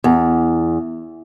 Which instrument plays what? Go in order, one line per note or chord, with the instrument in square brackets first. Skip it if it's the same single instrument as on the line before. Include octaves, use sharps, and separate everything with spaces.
[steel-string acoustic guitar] E2